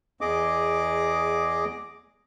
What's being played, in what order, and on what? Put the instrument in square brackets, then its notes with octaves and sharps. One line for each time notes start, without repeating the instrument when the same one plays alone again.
[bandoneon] E2 G#4 D#5 D6